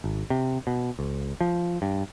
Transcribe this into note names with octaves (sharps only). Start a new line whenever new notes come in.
G#1
C3
B2
C#2
F3
G2